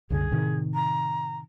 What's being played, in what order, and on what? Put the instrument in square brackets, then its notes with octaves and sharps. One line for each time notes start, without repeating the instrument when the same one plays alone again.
[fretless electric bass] C2 F#2 D3 [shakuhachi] G#4
[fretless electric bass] A2 C3 D#3
[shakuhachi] A#5